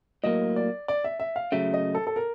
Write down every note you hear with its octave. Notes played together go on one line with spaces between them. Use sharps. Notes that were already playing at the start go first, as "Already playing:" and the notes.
A2 F#3 A#3 D#5
D5
D5
E5
E5
F5
C#3 F#3 A3 E5
D#5
A4
A4
A#4